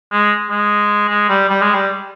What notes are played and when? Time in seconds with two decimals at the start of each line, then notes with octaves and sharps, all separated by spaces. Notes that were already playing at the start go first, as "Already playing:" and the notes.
0.12 G#3
0.50 G#3
1.09 G#3
1.29 G3
1.49 G3
1.62 G#3
1.74 G3